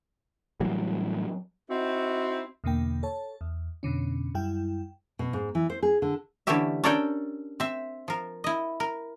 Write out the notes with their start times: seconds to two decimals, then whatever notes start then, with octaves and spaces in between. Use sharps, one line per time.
0.60 A2 E3 F#3 G3
1.70 C4 D#4 E4 F#4
2.64 E2 B2 D3 A#3 G5
3.03 A4 C#5 A5
3.41 E2
3.83 F2 B2 D3 C#4
4.35 F#2 G3 E4 G5
5.19 B2
5.33 G#2
5.55 E3
5.70 C5
5.83 G#4
6.02 D3
6.47 D3 E3 A3 C#4 G4 E5
6.84 C#4 D4 A4 A#4 D5 G5
7.60 C4 E5
8.08 F3 A#4
8.44 E4 D#5
8.80 A#4